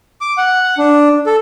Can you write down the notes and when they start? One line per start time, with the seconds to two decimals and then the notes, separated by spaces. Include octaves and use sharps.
0.21 D6
0.38 F#5
0.78 D4
1.26 A4